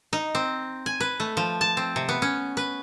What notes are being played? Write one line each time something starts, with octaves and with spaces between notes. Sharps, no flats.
D#4
C4
G#5
B4
A3
F3
A5
C4
C3
B3
C#4
B4